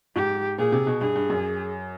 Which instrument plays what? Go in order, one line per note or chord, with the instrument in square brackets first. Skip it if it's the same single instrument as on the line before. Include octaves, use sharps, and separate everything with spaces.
[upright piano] G#2 [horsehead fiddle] G4
[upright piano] A#2 [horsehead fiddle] G#4
[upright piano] C3
B2
[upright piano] G2 [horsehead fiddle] G#4
[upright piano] G2
F#2